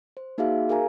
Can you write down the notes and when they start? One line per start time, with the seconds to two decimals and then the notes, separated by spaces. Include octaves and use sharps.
0.17 C5
0.38 A#3 D#4 F#4 G#4 E5 F5
0.69 G#4 A#4 F5 G#5 A#5